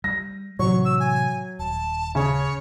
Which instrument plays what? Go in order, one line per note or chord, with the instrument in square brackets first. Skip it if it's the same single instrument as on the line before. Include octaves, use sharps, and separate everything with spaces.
[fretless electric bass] G3 [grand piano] A#6
[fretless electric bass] A2 C3 E3 [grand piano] F#3 [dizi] C#6
[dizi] E6
G#5
[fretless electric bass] D#1 [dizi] A5
[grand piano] C#3 [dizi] C#5